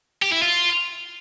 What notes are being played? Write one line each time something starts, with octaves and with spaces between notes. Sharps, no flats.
G4
E4
F4